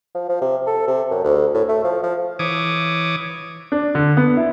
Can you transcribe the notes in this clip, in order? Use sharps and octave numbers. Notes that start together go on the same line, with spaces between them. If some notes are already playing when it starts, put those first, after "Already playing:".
F3
F3
C3
A4
C3
F#2
D2
A2
A3
F3
F3
E3 C#5 D6 D#6
D4
D3
B3
E4